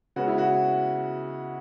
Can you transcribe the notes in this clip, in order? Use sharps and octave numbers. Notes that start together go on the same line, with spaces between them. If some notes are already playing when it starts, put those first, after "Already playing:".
C#3 G#3 B3 F#4
E4
F#4